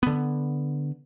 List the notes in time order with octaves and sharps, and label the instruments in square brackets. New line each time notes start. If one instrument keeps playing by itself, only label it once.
[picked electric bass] D3 B3